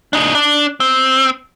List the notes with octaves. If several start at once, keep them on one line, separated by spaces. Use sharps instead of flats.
D4 D#4
D4
C4